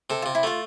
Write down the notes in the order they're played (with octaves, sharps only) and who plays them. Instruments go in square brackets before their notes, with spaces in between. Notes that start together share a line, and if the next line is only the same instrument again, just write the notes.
[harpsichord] C3 [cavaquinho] A4
[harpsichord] C3 [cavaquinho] F4
[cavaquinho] E4
[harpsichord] A3 [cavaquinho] F4